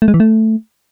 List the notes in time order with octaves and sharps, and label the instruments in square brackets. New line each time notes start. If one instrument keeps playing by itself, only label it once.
[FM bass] A3
G#3
E3
A3